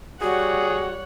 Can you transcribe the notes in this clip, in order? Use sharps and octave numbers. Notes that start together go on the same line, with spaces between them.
G3 F#4 G#4 C#5 F#5